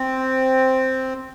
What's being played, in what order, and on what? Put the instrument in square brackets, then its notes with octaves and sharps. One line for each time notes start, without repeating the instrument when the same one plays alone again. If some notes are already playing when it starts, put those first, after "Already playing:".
Already playing: [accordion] C4